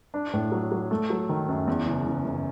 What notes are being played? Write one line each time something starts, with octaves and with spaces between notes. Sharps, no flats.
D4
A2
F#3
F#3
A3
F#3
D#3
F#2
E2
F#1
F#1
F#1